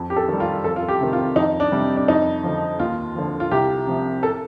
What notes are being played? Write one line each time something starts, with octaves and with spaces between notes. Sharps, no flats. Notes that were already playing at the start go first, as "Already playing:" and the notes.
Already playing: F2
G4
A4
D#3 G3
F4
F2 A4
F4
G4
C3 D#3
F4
F2 D#4
D4
C3 G3
D4
F2 D#4
D3 F3
D#2 F4
D3 F3
F4
C2 G4
C3 F3
A4